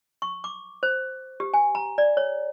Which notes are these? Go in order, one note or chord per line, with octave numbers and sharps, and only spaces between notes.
C#6
D6
C5
G4
G#5
A#5
D5
C#5